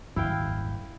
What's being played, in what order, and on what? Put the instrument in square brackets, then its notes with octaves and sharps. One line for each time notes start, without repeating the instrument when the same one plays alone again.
[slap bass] D#1 G#1 F#2 [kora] E4 F5 G5